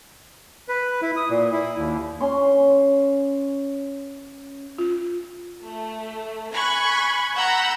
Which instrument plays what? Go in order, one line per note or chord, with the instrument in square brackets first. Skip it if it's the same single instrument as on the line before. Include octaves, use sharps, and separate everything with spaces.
[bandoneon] B4
E4
D#6
A#2
E4
D#2
[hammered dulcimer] C#4 C6
[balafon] F4
[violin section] A3
G#5 B5 C#6 F#6 G#6
F#5 A#5 B5 E6 G6